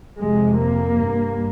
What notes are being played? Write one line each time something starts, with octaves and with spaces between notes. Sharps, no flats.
F2 C3 G#3
A#3
G2